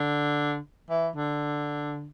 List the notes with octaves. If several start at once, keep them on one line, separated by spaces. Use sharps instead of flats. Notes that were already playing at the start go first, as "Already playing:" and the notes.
Already playing: D3
E3
D3